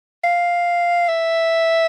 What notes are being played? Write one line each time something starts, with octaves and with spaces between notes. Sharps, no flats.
F5
E5